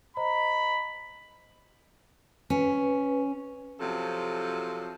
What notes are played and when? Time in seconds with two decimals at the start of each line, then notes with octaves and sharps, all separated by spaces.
0.17 C5 D#5 A#5 B5
2.50 C#4 B4
3.80 C3 F3 F#3 A4